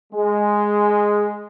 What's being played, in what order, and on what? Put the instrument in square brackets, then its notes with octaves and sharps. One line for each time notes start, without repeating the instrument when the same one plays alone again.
[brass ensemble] G#3